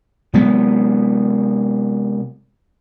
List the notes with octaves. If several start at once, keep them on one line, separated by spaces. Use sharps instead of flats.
C3 F#3 G#3 B3